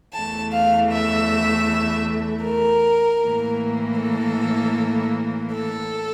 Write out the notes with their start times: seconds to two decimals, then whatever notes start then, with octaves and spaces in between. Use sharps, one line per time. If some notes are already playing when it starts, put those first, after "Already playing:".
0.14 E2 E3 A3 A5
0.53 F5
0.92 E5
2.45 A#4
3.23 A2 E3 A#3
3.99 A4
5.53 A4